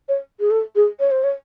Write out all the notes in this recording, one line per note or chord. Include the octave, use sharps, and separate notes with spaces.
C#5
G#4
A4
G#4
C#5
C5
C#5